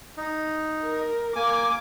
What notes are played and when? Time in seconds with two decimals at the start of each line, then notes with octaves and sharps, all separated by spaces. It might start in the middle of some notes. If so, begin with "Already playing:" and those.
0.17 D#4
0.84 A#4
1.36 A#3 G#5 D6